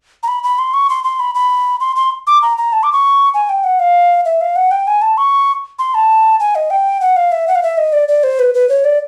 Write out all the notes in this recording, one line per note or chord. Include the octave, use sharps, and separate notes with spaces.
A#5
B5
B5
C6
C#6
C6
C6
B5
B5
C6
C6
D6
A#5
A#5
A5
D6
C#6
G#5
G5
F#5
F5
E5
F5
F#5
G5
G#5
A5
C#6
C6
A5
G#5
D#5
G5
F#5
F5
E5
F#5
F5
E5
D#5
D5
D5
C5
B4
B4
C#5
D5